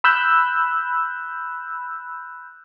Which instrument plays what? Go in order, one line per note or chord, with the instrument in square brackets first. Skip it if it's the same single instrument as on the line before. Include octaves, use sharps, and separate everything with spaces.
[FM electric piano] B5 E6 F#6 G6